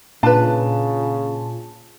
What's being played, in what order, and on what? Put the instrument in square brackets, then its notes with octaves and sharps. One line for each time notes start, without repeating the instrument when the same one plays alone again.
[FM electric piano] A#2 F4 [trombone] C#3 [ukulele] D4 B4 [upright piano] A5